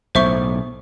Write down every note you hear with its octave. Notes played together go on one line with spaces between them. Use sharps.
B1 A2 C5 E5 C#6